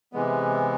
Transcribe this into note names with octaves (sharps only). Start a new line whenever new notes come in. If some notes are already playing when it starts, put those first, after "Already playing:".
C3 E3 G#3 B3